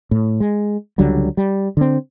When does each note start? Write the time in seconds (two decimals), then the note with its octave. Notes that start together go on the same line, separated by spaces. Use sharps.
0.11 A2
0.40 G#3
0.98 C#2 D3 F#3 G3
1.37 G3
1.77 D3 C4